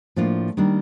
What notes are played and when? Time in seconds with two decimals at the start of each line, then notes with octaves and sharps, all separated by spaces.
0.16 A2 F3 A#3 D4 F4
0.57 D#3 G3 A#3 D4